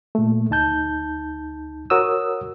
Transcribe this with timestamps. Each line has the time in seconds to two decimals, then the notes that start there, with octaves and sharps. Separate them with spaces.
0.15 A#2 A3
0.50 D2 D#4 A5 G6
1.90 F#4 A#4 C#5 D#6 E6